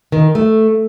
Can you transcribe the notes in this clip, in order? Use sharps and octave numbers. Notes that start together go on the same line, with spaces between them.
D#3
A3